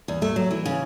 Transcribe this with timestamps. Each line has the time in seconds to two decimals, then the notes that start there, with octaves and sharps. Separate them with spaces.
0.08 E2
0.22 A3
0.36 F#3
0.51 E3
0.66 C#3